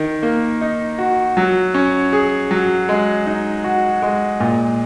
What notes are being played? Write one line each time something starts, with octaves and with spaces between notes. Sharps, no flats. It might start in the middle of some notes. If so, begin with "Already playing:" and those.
Already playing: D#3
A#3
D#4
F#4
F#3
C#4
G#4
F#3
G#3
D#4
F#4
G#3
A#2